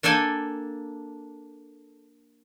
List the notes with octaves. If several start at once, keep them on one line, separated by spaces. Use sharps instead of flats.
A#3 D4 A4 G5 G#5